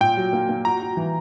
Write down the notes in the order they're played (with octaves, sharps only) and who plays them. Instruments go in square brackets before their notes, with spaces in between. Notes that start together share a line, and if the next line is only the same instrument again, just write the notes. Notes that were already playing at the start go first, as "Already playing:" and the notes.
[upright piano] A#2 [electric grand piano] G5
[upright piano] F#3
A#3
A#3
[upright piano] F#4 [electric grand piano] A#5
[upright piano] F#4
E3